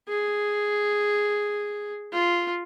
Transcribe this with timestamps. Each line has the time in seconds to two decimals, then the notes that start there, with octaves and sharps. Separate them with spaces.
0.08 G#4
2.13 F4